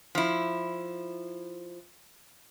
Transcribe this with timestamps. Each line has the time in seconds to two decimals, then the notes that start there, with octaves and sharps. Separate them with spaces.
0.15 F3 E4